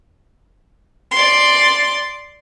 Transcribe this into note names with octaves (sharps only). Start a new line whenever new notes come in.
D5 C6